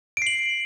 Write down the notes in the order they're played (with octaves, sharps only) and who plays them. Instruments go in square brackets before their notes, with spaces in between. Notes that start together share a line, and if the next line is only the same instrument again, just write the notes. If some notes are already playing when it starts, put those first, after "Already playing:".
[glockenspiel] D7
C7
F#7